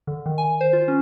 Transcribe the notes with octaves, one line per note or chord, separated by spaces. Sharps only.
D3
D#3
G#5
C5
F4
C#4